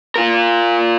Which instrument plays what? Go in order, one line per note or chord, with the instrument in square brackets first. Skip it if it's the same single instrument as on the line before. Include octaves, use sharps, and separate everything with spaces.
[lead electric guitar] F4 A#4